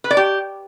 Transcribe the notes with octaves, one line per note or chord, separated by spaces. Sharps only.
B4
D5
G4